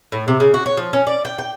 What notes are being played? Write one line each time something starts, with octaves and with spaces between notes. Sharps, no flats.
A2
C3
C#3
F#4
C#5
F3
C#4
D5
G5
G5